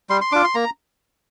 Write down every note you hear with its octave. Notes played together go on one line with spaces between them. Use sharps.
G3 C6
C6
D4 F4 D6
C6
A#3 A#5